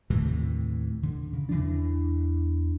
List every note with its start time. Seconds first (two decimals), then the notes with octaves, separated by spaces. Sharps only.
0.10 D#2 A2 C3 E3
1.03 D3
1.33 C#3
1.49 E2 E3 D4